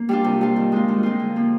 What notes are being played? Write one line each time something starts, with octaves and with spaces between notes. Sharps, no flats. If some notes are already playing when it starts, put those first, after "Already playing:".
Already playing: A#3
G3 D4 F4
C3
G3 D4 F4
D#3
G#3 C4 F4
D#3
G#3 C4 F4
D3
F3 A#3